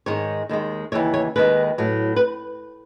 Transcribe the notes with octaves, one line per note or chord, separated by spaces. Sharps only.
G#2 D#3 G#3 C#5
D#2 D#3 G#3
D#2 C#3 E3 C#5
C#5
D#2 D#3 G#3 B4
A2 F#3
B4